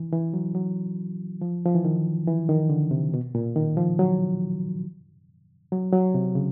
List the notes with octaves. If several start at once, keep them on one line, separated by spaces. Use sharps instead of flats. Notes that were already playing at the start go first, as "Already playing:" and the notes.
Already playing: E3
E3
F#3
F#3
F3
F3
E3
D#3
E3
D#3
D3
C3
B2
A#2
D#3
F3
F#3
F#3
F#3
C3
C#3